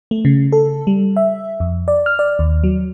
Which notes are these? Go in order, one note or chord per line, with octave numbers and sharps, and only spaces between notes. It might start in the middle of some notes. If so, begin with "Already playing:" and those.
A3
C#3
A4
G3
E5
F2
D5
F6
D5
D#2
F#3